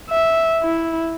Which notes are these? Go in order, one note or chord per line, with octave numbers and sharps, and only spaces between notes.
E5
E4